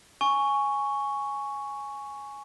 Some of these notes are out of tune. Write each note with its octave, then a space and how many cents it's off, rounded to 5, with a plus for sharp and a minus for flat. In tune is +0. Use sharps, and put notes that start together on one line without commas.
G#5 +0 C#6 +0